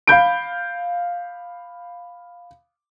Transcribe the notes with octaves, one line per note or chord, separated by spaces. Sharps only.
F5 B5 G6 D7